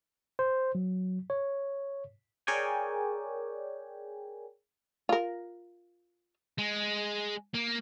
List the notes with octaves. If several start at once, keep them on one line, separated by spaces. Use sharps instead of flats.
C5
F#3
C#5
G#4 A#4 C#5 D5 G5 G#5
F4 A#4
G#3
A#3